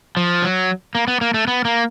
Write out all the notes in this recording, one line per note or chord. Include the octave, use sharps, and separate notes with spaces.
F3
F#3
A#3
B3
A#3
A3
B3
A#3